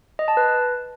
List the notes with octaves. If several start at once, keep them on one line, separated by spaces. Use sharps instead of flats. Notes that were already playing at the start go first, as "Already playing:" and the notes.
D#5
A5
B4